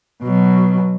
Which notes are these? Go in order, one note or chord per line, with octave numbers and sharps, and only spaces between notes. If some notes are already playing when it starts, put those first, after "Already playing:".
B2 F#3